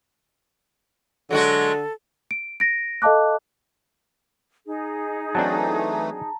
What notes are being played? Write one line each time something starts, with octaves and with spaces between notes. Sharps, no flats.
D3 F#3 G#3 F#4 A4
D7
A#6 D7
A4 D#5 F5 A5 D6 F#6
D#4 G#4
E3 F#3 A3 C4 D4 A5 A#5